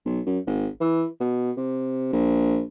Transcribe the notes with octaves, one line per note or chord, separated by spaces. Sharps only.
B1
F#2
G#1
E3
B2
C3
A#1